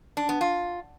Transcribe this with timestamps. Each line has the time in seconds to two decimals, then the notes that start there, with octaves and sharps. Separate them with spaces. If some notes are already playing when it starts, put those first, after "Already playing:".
0.17 D4
0.29 B3
0.41 F4